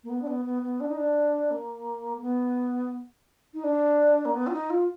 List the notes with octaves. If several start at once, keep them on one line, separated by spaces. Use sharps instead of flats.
A#3
B3
D4
B3
B3
B3
D4
D#4
D4
A#3
A#3
B3
D#4
D4
A#3
B3
F4
D#4
F4